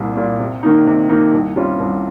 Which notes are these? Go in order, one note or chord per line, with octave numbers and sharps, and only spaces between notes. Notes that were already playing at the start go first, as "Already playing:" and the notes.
Already playing: C2 A#2 G3
A#2 G3
C3
D#3 A#3 D#4
C3
D#3 A#3 D#4
C2
C3 G3 C#4 F4
C2